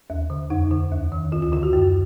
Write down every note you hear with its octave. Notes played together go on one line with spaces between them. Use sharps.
D#2
D3
F2 D#4
D3
D#2
D#3
D2 F4
F4
D3 F4
F#4
F#2 F#4